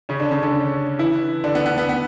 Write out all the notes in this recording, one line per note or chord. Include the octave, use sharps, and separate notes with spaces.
C#3 C#4
D3 D4
C#3 C#4
D3 D4
E3 E4
D3 D4
B3
B3
B3
B3